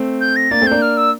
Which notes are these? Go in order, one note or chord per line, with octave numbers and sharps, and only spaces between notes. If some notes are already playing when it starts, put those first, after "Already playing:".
Already playing: A3 C4
G6
A#6
A#3 D4 A6
A3 C4
A#3 D4 G6
F6
E6